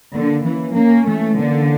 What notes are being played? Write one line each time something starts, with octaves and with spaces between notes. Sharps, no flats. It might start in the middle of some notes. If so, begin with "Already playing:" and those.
D3 A#3
E3 C#4
A#3 C#4
E3 A3
D3 A#3